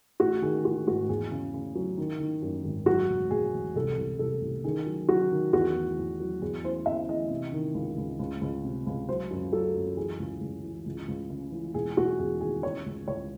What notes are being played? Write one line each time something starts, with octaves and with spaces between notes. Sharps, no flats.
A1 F#4
D#3 G#4
A1 F#4
G#2 F#4
E2 G#4
C#3
C#3
F#3
D#3
D#3
F#2
G#1
F#3 F#4
E1
E1 G#4
E1
C2 A4
C2
C2 A4
C2
D#3 G#4
F#3
F#3 F#4
D#3
E2 F#4
E2
E2
F#3
E2 G#4
E3 C5
E2 E5
E3 D#5
C3
D#3
C#2
C#2
C#2
C#2
C3
C#2
F#3 C5
F#2
F#3 A4
F#2
E3 G#4
C#2
C#2
E3
C#2
C#2
C#3
E3
E1 G#4
E1 F#4
E2 G#4
D#3 G#4
C#3 C#5
C#2
C#2 C#5